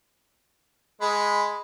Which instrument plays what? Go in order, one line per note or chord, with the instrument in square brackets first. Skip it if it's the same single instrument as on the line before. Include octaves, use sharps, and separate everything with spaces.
[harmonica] G#3 B5